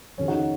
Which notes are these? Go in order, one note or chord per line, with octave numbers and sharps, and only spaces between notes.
F1 D#2 C#3 F3 C#4
D#4 F#4